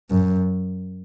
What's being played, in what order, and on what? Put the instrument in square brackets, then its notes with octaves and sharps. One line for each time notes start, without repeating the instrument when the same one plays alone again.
[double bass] F#2